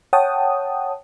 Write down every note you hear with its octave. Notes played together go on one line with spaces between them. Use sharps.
C#5 F#5 G5 A5 D#6